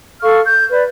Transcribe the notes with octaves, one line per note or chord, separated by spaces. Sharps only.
A4 F5 C#6 F6
G6
B4 D5